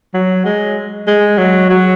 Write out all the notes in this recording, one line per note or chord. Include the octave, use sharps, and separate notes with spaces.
F#3
G#3
G#3
F#3
F#3